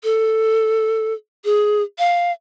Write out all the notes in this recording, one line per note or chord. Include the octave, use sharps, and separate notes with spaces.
A4
G#4
F5